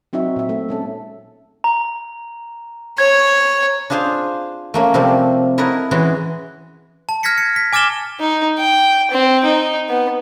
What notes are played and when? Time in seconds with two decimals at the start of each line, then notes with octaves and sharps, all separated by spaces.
0.13 F#3 C4 D#4 F#4 E5
0.36 A#2 E5
0.49 A3
0.69 G#3 C#4 A4
1.64 A#5
2.98 C#5 G#6
3.90 D4 F4 G#4 C5 F5 G#5
4.74 A3 A#3 C#4
4.94 C3 F3 G3 A3 A#3
5.58 E4 A4 A#4 C#5 D#5 F#5
5.91 E3 G#3 C#4 F#4
7.09 A5
7.23 F6 G#6 A#6 B6 C#7
7.38 C#7
7.56 B6
7.73 G#5 D6 F6 A6 E7 G7
8.20 D#4
8.59 G5
9.11 C4
9.44 D#4
9.89 B3